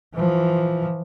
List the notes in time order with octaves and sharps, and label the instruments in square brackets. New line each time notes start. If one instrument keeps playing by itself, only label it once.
[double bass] E3 F3